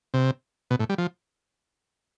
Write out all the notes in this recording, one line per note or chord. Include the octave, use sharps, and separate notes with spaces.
C3
B2
A2
G3
F3